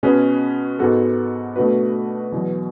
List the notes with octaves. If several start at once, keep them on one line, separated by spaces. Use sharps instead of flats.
B2 G#3 C#4 G#4 B4
G#2 G#3 B3 F#4 A4
B2 A3 D4 F#4 B4
E2 B2 F#3